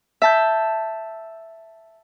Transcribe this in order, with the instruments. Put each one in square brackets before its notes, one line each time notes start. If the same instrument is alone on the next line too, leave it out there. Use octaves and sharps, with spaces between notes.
[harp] E5 A5 G6